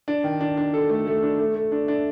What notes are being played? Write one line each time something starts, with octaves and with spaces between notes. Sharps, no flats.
D4
D#3
D4
D4
A4
A3
A3
D4
A3
A3
D4
D4